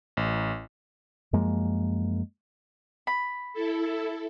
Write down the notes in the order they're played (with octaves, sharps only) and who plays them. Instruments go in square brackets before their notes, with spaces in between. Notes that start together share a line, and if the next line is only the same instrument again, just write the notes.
[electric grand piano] A1
[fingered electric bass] F#2 F3 G#3 A#3
[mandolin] B5
[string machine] E4 A4